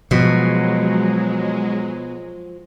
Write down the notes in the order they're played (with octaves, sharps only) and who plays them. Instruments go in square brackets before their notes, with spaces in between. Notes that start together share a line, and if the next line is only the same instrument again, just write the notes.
[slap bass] B2 [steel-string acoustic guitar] F3 [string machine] F#3 G#3